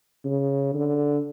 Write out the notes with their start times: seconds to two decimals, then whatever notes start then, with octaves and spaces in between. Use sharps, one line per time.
0.25 C#3
0.74 D3